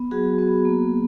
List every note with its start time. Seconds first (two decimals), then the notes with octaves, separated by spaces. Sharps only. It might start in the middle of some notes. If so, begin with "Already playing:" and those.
Already playing: B3
0.11 F#3 F#4 G#4
0.38 B3
0.65 A#3